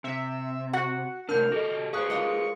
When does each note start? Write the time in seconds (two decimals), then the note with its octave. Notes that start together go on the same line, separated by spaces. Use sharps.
0.04 C3 E5
0.73 F#4 F#5
1.29 A2 C3 D4 A#4 F6 G6
1.52 F#4 G4 A4 D#5
1.93 G#4 B4 C5 F5 C#6 D#6 F#6
2.10 G#3 A#3 F4